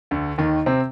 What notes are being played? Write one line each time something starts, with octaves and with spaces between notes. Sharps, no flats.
D2 D3
D#2 D#3
C3 C4